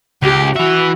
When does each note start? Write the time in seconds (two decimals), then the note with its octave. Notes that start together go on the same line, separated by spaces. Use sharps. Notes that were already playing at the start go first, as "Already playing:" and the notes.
0.22 C#2 G4
0.56 E3 F#4 E5